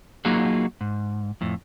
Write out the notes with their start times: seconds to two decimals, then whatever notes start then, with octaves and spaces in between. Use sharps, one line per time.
0.25 F#3 A#3 D#4 F4 F#4 G#4
0.81 G#2
1.41 F2 A2